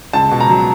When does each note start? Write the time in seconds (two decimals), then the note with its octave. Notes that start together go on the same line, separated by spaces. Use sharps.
0.13 C#2 A5
0.31 B2
0.40 A#5
0.50 F#3